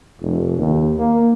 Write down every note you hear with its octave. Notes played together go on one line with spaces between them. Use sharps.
F1
D#2
A#3